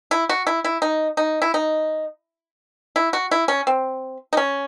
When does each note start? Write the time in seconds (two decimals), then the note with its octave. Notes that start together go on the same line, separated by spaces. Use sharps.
0.11 E4
0.29 F#4
0.47 E4
0.64 E4
0.82 D#4
1.17 D#4
1.42 E4
1.54 D#4
2.96 E4
3.13 F#4
3.31 E4
3.48 C#4
3.67 C4
4.33 D#4
4.37 C#4